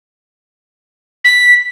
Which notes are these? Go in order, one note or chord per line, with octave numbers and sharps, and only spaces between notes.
B6